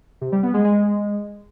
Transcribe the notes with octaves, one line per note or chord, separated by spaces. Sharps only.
C3
G3
B3
G#3
G#3